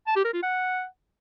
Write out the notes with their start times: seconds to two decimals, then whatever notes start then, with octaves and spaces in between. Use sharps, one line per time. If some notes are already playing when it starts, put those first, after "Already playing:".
0.07 A5
0.16 G4
0.25 A#4
0.34 F4
0.43 F#5